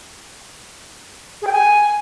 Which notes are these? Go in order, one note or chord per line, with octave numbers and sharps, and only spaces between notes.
G#4
G5
G#5